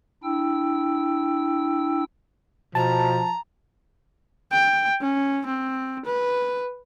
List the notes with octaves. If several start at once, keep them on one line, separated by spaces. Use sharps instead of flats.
D4 E4 G5 E6
B2 F3 A5 A#5
G5
C#4
C4
B4